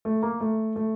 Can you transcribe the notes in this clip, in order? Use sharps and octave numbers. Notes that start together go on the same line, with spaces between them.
A3
A#3
A3
A3